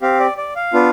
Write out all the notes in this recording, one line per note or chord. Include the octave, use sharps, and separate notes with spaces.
C4 G4 F5
D5
D5
F5
B3 D4 F4